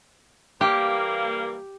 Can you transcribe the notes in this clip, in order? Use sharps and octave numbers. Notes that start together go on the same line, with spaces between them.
E3 G3 A#3 G4